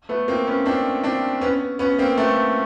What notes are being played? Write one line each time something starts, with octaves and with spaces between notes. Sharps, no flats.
A3 B3
A#3 C4
B3 C#4
C4 D4
C4 D4
B3 C#4
B3 C#4
A#3 C4
A3 B3